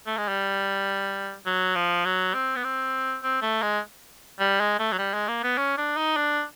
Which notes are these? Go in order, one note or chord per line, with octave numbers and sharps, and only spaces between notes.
A3
G#3
G3
F#3
F3
F#3
C4
B3
C4
C4
A3
G#3
G3
G#3
A3
F#3
G3
G#3
A#3
B3
C#4
D4
D#4
D4